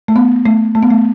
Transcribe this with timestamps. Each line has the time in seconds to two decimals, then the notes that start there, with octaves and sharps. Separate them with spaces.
0.08 A3
0.16 B3
0.46 A3
0.75 A3
0.83 B3
0.90 A3